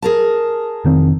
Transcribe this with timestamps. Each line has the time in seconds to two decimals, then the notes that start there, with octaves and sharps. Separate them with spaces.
0.02 G#4 A#4 A5
0.84 F1 D#3 C4